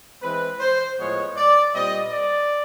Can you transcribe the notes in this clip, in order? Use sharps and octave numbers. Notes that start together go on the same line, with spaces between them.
E3 G#3 C4 B4
C5
A2 F3 G#3 B3 C#5
D5
A#2 G3 C4 D#5
D5